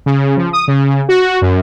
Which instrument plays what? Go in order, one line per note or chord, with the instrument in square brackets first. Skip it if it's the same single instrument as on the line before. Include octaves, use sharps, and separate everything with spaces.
[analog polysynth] C#3
F3
D#6
C#3
F#4
F#2